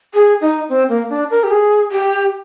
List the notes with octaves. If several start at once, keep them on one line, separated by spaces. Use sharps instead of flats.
G#4
D#4
C4
A#3
D4
A#4
G4
G#4
G4